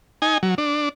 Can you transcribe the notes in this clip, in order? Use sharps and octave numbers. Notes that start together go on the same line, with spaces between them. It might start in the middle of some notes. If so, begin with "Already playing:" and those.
D#4 G#5
F#3
D4